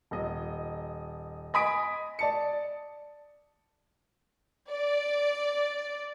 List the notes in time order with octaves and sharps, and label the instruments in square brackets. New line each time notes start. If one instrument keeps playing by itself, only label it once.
[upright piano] D#1 D#5
D#5 G#5 B5 D#6 B6 D7
D5 A5 C#7
[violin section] D5